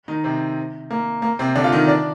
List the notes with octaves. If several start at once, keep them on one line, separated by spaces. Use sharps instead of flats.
D#3 D#4
C3 C4
A#3
A#3
C3 C4
D3 D4
F4
D#3 D#4
D4 D5